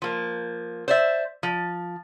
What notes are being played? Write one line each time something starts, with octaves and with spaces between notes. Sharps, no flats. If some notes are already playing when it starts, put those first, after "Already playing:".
F3 A#3
C5 D5 E5
F3